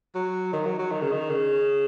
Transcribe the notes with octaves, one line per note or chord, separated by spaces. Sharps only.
F#3
D#3
F#3
F#3
D#3
C#3
D#3
C#3